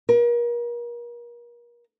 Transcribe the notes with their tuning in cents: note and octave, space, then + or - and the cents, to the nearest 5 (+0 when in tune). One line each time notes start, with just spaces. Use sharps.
A#4 +35